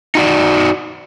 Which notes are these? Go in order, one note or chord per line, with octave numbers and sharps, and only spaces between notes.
D#4 F#4 D5